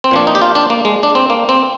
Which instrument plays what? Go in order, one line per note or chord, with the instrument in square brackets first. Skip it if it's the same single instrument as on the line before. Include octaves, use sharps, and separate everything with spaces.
[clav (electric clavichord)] C4
A#2 F3 D4
D#4
G4
F4
D4
A#3
G#3
D4
C4
A#3
C4